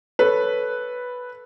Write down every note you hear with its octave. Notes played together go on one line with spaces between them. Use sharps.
A4 B4 C#5